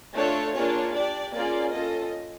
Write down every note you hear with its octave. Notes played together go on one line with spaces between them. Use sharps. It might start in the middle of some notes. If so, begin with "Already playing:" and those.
A3 D4 F4 A4 C#5
A#3 D4 F4 G#4 C#5
D4 G4 D5
A#3 C#4 F4 G#4 D5
C#4 F4 A4 D#5